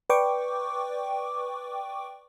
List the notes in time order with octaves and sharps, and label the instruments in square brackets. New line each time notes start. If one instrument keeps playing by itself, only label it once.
[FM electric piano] B4 D5 G5 C#6 D6